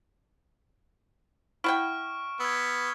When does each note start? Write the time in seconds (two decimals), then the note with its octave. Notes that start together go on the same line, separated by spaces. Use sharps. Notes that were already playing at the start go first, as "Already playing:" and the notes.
1.64 E4 F#5 G5 C#6 F6 D7
2.40 B3 E6 G#6